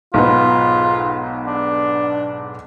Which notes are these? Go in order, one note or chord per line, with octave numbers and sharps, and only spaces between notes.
B1 G#2 B3 F4
D4